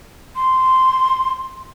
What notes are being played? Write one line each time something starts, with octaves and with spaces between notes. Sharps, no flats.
C6